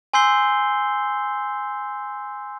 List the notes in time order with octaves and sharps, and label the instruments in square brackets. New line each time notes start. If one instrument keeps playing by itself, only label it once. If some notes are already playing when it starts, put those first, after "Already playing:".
[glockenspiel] G#5 C6 E6 G6 C7 G7